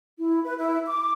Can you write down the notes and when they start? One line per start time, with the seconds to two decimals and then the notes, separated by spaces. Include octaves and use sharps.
0.18 E4
0.43 B4
0.57 E4
0.87 D6